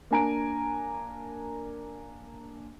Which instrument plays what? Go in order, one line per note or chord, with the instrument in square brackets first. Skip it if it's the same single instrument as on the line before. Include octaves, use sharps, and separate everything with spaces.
[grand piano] A#3 D4 G#5 A#5 D7